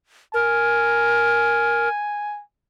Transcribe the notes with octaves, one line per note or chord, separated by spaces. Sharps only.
A#4 G#5